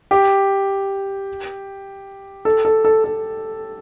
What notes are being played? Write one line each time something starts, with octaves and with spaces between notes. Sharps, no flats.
G4
A4
A4
A4
A4